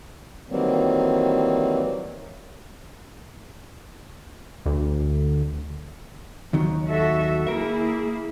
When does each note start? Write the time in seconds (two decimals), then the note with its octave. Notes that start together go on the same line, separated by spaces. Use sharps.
0.49 D#3 E3 F#3 G3 A#3 C4
4.66 D2
6.53 D#2 D#3 F#3
6.88 F#4 A4 E5
7.47 A#3 E4 G#4 A#4 E5